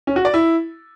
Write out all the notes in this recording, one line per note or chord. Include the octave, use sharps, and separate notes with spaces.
C#4
F#4
D5
E4